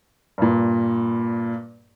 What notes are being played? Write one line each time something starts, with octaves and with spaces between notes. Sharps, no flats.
G2 A#2